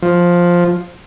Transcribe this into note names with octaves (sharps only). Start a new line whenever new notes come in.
F3